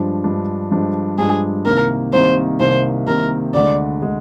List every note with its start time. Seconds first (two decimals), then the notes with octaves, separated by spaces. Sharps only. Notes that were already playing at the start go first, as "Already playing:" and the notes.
Already playing: G2 F3 G#3 D4
0.24 G2 F3 G#3 D4
0.71 G2 F3 G#3 D4
1.18 G2 F3 G#3 D4 G#4
1.66 C2 C3 D#3 A#3 A#4
2.13 C2 C3 D#3 A#3 C5
2.60 C2 C3 D#3 A#3 C5
3.07 C2 C3 D#3 A#3 A#4
3.54 D2 D3 G#3 D5
4.02 D3 G#3